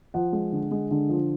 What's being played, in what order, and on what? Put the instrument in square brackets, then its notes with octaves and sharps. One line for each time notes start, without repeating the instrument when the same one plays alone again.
[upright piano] F3 F#5
G#3
D3
G#3
D3
F3